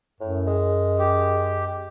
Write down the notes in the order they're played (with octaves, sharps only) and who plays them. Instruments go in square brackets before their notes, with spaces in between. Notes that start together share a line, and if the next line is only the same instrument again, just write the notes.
[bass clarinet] F#2 [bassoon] A2
[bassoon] G#3
[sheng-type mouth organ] G4